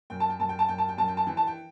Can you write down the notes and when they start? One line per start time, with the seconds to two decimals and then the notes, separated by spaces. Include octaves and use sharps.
0.10 F#2 G5
0.20 A5
0.30 G5
0.39 F#2 A5
0.49 G5
0.59 A5
0.68 F#2 G5
0.78 A5
0.89 G5
0.97 F#2 A5
1.08 G5
1.17 A5
1.27 E3 G5
1.37 A5
1.47 G5